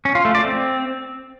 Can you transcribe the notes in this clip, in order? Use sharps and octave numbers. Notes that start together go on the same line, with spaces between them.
C#4
F4
A3
D5
C4